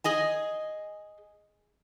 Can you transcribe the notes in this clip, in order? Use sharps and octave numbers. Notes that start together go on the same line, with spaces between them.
G#4 D#5 G#5